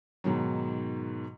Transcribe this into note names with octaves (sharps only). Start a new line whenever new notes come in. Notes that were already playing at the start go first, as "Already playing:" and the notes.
G#2 B2 D#3 F#3